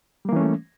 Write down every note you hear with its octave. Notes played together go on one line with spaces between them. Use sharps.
E3 G3 A3 A#3 C#4